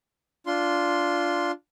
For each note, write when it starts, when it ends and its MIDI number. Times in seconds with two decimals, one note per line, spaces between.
0.46 1.52 62
0.46 1.52 65
0.46 1.52 84